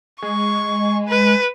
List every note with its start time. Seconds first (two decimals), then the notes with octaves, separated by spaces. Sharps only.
0.22 G#3 C#6
1.08 B4